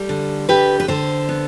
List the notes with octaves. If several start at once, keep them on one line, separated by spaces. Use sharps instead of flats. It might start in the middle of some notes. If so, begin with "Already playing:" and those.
Already playing: G3 A4
D3
D3 G4 B4
B4
D3 A4 C5
B3